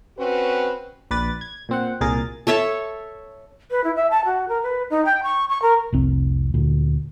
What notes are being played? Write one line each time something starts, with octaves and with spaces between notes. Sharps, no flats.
C4 C#4 F#4 B4
A#1 B4 D5 A6
G#6
A#2 C4 F#5
C2 A#2 G#4 A#4 A6
A4 C#5 E5 A5
B4
E4
E5
A5
F#4
A#4
B4
D#4
G5
C#6
C#6
A#4
F1 C2 C4
D2 A#2